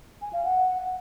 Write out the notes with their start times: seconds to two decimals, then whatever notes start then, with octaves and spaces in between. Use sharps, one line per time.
0.22 G#5
0.33 F5
0.45 F#5